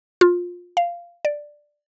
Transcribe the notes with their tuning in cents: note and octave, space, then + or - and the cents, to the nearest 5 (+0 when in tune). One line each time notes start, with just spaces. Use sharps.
F4 +20
F5 -10
D5 +5